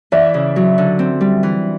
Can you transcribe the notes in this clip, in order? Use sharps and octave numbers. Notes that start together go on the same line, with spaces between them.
E3 D5 E5
C#3
F#3
D3
C4
G3
E3